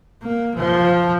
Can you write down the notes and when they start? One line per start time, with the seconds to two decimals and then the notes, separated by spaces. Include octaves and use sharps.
0.23 A#3
0.56 F3